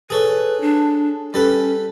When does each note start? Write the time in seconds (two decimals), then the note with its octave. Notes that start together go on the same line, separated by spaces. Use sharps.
0.10 G#4 A4 B4 C#5
0.61 D4
1.34 G3 C#4 A4 B4